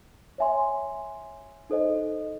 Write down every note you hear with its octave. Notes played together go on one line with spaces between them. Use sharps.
C#5 E5 G#5 C6
D#4 A4 C5 D#5